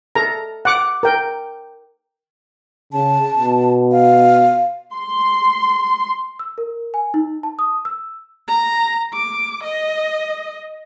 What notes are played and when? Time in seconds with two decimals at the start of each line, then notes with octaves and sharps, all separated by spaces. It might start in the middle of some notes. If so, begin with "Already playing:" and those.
0.15 A4 A#5
0.65 F#5 D6
1.03 A#4 G5
2.93 C#3 A5
3.35 B2
3.92 F5
4.94 C6
6.39 E6
6.58 A#4
6.94 G#5
7.14 D#4
7.43 A5
7.59 D#6
7.85 E6
8.48 A#5
9.14 D6
9.64 D#5